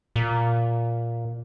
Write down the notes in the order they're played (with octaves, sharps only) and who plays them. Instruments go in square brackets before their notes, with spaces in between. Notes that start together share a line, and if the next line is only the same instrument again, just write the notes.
[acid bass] A#2